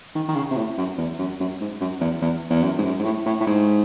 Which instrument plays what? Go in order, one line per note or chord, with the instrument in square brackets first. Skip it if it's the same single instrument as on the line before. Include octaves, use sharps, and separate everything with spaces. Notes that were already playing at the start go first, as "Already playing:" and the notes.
[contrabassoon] D#3
D#3
C#3
C3
A2
F#2
E2
F#2
F#2
G#2
F#2
E2
E2
E2
F#2
G#2
F#2
G#2
A2
A2
A2
G#2